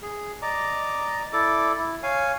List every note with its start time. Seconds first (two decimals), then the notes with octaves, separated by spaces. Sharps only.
0.02 G#4
0.42 D5 D#5 A#5 D6
1.33 E4 A4 D5 D6
1.78 E4
2.03 C#5 F5 G#5